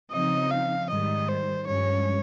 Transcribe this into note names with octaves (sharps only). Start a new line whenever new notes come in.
C#3 F3 C4 D#4 D#5
F5
G#2 D#3 G3 D#5
C5
G2 F3 G#3 C#4 C#5